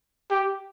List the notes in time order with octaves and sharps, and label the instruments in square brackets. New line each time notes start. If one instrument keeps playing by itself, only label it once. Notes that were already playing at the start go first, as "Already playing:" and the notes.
[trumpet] G4